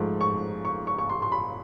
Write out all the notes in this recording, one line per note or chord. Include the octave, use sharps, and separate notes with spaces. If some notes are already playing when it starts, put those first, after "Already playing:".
Already playing: G#2 F3 A3
C#6
C#6
C#6
C#6
C6
C6
B5